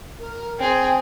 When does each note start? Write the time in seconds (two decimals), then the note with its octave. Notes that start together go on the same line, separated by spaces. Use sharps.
0.19 A#4
0.59 C4 G#4 G5